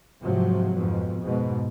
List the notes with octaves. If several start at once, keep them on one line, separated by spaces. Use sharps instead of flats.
G#2 C3 F3 F#3
F2 G#2 B2
G#2 B2